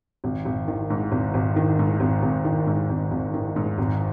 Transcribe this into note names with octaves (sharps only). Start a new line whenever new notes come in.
G#1
G#1
D#3
G#2
G#1
G#1
D#3
G#2
G#1
G#1
D#3
G#2
G#1
G#1
D#3
G#2
G#1